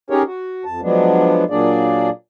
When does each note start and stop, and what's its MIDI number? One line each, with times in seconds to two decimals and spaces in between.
0.10 0.23 61
0.10 0.23 63
0.10 0.23 67
0.10 0.23 68
0.10 0.23 70
0.10 0.23 73
0.26 0.64 66
0.65 0.81 41
0.65 0.81 81
0.82 1.44 53
0.82 1.44 54
0.82 1.44 56
0.82 1.44 59
0.82 1.44 62
1.50 2.10 46
1.50 2.10 54
1.50 2.10 58
1.50 2.10 62
1.50 2.10 68
1.50 2.10 74